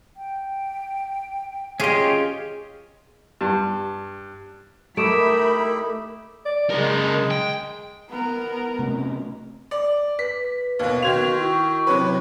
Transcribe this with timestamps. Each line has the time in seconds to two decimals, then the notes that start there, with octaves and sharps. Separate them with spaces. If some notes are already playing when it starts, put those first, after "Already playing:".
0.17 G5
1.80 C#4 F4 G4 G#4 D#5
3.41 G2
4.97 A3 D#4 E4 G4 A#4 B5 D7 E7
6.45 D5
6.71 C#3 G#3 A#4
7.31 G5
8.09 B3 A#4
8.79 C3 A3 C#4
9.71 D5
10.19 B4 B6
10.79 D#2 B2 F5
11.02 D#3 F#4 C6 G#6 F7
11.39 E4 F#4 C#6
11.87 C3 F#3 B4